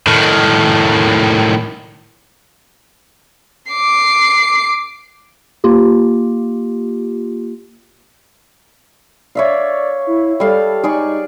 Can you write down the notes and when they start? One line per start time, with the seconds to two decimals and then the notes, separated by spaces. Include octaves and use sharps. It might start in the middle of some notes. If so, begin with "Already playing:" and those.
0.07 A2 D#3
3.71 D6 C7
5.64 A#3 F4 G4
9.35 C#5 D5 E5 F5
10.07 E4
10.40 G3 A4 F5
10.84 D#4 G#4 D5 C#6